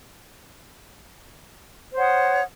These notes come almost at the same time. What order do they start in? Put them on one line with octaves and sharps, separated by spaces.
C5 C#5 F#5 D#6